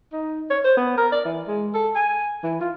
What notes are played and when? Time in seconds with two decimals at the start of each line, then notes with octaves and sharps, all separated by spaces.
0.13 D#4
0.50 C#5
0.65 C5
0.77 B3
0.98 A#4
1.12 D5
1.25 E3
1.48 G#3
1.75 A4
1.96 G#5
2.44 E3
2.61 F4